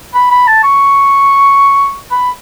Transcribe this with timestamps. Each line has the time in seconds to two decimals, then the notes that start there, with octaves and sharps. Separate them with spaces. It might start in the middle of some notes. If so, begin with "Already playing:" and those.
0.14 B5
0.31 B5
0.47 A5
0.63 C#6
2.11 B5